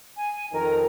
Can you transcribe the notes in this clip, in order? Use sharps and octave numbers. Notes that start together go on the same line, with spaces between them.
G#5
F2 D#3 A#4